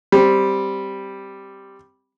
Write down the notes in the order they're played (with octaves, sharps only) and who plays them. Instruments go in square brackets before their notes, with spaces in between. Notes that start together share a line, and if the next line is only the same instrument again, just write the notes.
[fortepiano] G3 C4